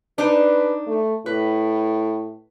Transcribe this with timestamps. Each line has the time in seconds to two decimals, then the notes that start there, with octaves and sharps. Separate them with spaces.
0.18 D4 D#4 B4 C5
0.87 A3
1.26 A2 B4